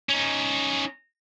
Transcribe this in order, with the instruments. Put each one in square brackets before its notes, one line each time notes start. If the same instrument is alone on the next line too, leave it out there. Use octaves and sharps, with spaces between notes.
[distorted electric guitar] C#4 D#4